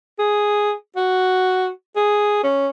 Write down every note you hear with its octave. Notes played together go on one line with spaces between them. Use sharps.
G#4
F#4
G#4
C#4